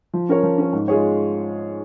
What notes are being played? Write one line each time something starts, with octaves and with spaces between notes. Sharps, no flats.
F3
C#4 A#4 C#5
F3
C#4 A#4 C#5
G#2
G#3 F4 G#4 C#5